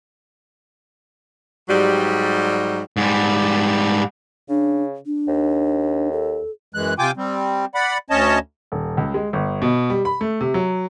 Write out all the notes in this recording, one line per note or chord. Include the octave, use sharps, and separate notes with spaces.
G#2 F#3 G3
G#2 G3
C#3 D4
D4
D#2
A4
F#2 E3 G#3 F#6
C3 F4 G5 G#5 D6
G3 C4
D5 F#5 B5
D2 C#4 C#5 D#5 A5
D#1
C#2
G#3
G1
B2
G3
B5
A3
C3
F#3